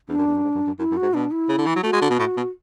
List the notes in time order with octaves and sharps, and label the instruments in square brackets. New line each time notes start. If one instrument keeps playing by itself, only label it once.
[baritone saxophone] E2 [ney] D4
[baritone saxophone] F#2
E2
F#2
G#2
F#2
F#2
[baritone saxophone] F#2 [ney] E4
[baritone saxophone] F#2
[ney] F#4
[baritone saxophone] G#2
[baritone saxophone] B2 [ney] D4
[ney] E4
[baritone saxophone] C#3
D3
E3
F#3
[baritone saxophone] A3 [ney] F#4
[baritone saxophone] G#3
D3
B2
A2
B2